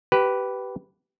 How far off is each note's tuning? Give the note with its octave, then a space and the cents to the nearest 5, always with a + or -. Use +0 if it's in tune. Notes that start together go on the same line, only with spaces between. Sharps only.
G4 -20 B4 +0